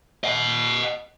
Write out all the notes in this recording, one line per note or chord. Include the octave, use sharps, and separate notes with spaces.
D#5 F#5